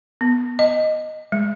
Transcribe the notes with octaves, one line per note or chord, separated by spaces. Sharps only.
B3
D#5
G#3